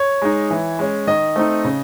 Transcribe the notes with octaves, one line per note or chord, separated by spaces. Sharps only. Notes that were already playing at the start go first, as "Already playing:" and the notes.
Already playing: C#5
G#3 D#4
E3
G#3 C#4
D#3 D#5
A3 C4 D#4
C#3